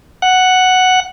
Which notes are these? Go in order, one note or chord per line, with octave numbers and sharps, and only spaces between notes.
F#5